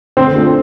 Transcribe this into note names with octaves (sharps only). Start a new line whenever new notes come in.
D3 C4
A3 D4 F4 A4